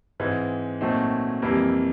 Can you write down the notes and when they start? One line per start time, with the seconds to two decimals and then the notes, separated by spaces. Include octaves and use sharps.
0.20 G#2 E3 G#3 C4
0.81 A#2 F#3 A3 C4 D#4
1.42 F2 C3 E3 G3 A#3